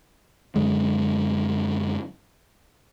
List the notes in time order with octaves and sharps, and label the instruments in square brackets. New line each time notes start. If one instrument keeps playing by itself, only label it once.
[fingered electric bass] F#2 D3 G#3